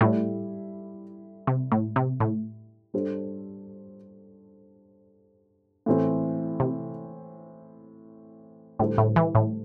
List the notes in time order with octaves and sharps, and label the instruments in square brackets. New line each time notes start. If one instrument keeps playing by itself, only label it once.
[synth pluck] A2 [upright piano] G3 E4 A4 D5
[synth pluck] C3
A2
C3
A2
[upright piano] G3 D4 A4 C5
A2 E3 C4
[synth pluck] C3
[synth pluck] A2 [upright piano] D3 G3 E4 A4 C5
[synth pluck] A2
E3
A2